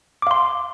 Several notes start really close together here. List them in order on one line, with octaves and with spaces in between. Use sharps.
D6 F5 C6